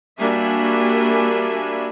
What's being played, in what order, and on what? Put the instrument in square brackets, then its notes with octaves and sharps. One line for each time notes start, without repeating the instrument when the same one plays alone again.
[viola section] G3 A#3 D4 F#4 E5 G#5